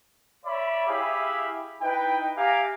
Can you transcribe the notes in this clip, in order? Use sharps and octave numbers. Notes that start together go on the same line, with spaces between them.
C#5 D5 E5 B5
E4 G4 G#4 E5 F5 B5
D#4 E4 B4 G5
G4 E5 F5 G#5 A#5 D6